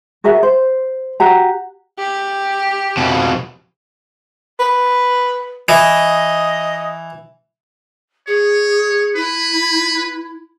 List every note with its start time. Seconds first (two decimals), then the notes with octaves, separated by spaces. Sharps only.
0.24 F#4 G#4 A#4 E5
0.43 C5
1.20 F#4 G4 A#5
1.99 G4
2.97 F2 B2
4.59 B4
5.69 E3 D#5
8.27 G#4 C#5
9.16 E4 B4